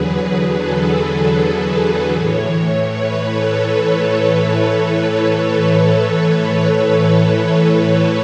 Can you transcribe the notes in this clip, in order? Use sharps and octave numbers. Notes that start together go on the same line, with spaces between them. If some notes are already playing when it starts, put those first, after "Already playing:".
Already playing: E2 D3 F#3 G#4 B4
G#4
A4
A4
B4
A2 E3 C#5
B4
A4